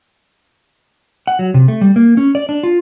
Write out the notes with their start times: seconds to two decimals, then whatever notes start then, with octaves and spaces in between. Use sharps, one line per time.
1.27 F#5
1.39 F#3
1.54 C3
1.68 A3
1.81 G3
1.96 A#3
2.17 C#4
2.35 D5
2.49 D4
2.63 F4